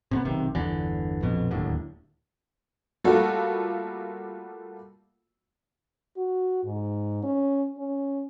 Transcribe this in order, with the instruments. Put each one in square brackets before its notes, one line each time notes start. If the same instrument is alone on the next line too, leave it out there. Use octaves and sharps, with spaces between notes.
[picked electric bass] C3 A3 B3
B1 C3 D#3
G1 E2 D3 E3
A#1 F2 B2
D1 D#2 A2 D3
[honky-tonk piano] G3 A3 A#3 F4 F#4 A4
[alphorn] F#4
G#2
C#4
C#4